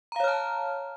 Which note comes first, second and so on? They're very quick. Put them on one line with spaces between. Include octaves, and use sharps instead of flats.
A#5 F5 C#5 F6 A5